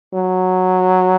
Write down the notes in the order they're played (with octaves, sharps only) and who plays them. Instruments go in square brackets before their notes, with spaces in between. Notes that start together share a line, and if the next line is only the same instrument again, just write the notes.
[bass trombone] F#3